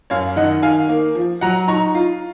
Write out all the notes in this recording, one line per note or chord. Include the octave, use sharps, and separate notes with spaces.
F#2 C#5 F5
D#3 D#5 F#5
D#3 F5 G#5
A#3
F3
F#3 F#5 A#5
D#4 A#5 C#6
F4